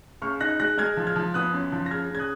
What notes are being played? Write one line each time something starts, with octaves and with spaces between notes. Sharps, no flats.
C#2 C#6 F6
D#4 F#6 A#6
G#3 F#6 A#6
G#3 F6 G#6
F3
F6 G#6
F3
B3 D#6 F#6
F#2
F3
A#6
C#3 F6 G#6
C#3 G#6
D#6 F#6